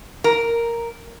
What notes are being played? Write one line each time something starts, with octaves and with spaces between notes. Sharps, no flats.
A#4